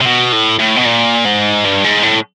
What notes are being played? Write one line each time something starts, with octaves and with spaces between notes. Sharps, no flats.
C3
B2
A2
A2
B2
A#2
G#2
G2
G#2
A2